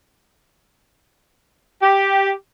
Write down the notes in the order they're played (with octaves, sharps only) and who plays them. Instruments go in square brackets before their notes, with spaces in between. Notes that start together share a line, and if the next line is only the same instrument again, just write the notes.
[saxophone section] G4